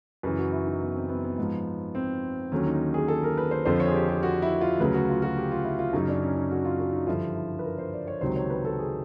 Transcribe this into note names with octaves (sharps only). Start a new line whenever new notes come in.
F#2 C#3 E3 B4
F#4
E4
D#4
B3
C4
B3
B3
G#2 F3
C4
D#2 D3 F#3 C#4
D#4
G#4
A4
A#4
B4
C5
F2 D3 F3 C5
C#5
G#4
G4
G4
F#4
E4
F4
D2 C#3 F#3 B4
F#4
F4
F#4
G4
F4
E4
F4
F#2 C#3 F#3 D#4
D4
C#4
D#4
F#4
F4
F#4
D#4
G2 D3 F3 E4
E4
B4
A#4
C5
D5
C#5
C#2 C3 D#3 F#3 C5
C#5
B4
A4
G#4